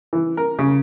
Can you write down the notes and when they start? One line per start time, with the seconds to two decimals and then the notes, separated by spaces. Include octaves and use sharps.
0.13 E3
0.37 A#4
0.59 C#3